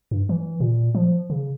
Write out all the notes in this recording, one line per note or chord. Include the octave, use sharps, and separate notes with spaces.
G2
E3
A#2
F3
C#3